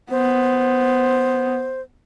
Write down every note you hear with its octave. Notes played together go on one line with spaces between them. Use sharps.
B3 C5